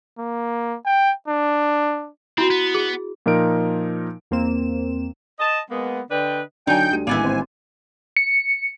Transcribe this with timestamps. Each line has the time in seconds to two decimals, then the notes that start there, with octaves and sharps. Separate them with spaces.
0.19 A#3
0.86 G5
1.28 D4
2.38 C4 E4 F#4
2.50 B3
2.75 G#4
3.26 A#2 F3 D#4 A#4 D7
4.31 E2 A#3 C4 E7
5.39 D#5 A5
5.70 G#3 A#3 B3
6.10 D3 D4 B4 D#5 G5
6.67 D3 F#3 D4 D#4 G5 G#5 G6
6.91 D2 G3 D#7
7.07 A1 G#2 D#3 A#3 B3 E4 G#5
7.24 C4 C5
8.17 C#7